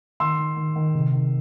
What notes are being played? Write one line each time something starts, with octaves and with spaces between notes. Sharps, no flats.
D#3 C6 E6
D#3
D#3
D#3
C3
D#3